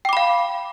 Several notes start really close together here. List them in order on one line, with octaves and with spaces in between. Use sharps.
G5 D6 B5 F5